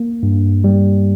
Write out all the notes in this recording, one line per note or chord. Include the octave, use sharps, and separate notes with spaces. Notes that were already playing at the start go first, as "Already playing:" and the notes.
Already playing: A#3
G2
G3